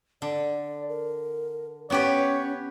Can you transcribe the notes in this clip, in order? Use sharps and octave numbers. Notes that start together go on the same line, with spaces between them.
D3 D5
A#4
B3 C#4 G4 B4 C#5